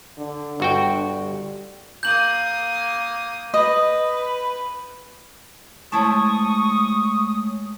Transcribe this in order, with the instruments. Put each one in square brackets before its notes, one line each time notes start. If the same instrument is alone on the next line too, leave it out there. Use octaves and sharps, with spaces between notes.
[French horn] D3
[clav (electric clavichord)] G1 F#4 G5 [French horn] D4
[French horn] G3
[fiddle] A#3 D#6 [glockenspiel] G6 F#7
[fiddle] B4 [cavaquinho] D#5
[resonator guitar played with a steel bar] F3 E4 A5 [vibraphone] G#3 A3 C#5 [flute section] C#6 [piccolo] D#6